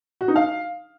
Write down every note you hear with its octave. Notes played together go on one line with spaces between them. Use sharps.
F#4
D#4
F5